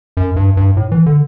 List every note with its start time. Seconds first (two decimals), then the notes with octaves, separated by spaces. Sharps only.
0.17 F#2
0.36 G2
0.57 G2
0.77 A2
0.92 E3
1.06 D3